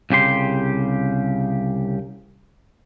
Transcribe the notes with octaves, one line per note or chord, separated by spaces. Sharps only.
C2 C#3 G4 C6